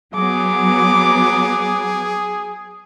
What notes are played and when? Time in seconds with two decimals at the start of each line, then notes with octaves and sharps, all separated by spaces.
0.15 F#3 B3 G#4 D6